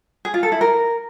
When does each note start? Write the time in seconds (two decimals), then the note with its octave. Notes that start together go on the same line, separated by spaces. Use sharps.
0.25 G#4
0.34 F4
0.43 A4
0.52 E4
0.61 A#4